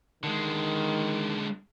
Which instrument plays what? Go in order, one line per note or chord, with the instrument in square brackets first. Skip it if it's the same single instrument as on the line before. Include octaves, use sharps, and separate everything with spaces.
[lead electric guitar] D3 G#3 [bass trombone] D#3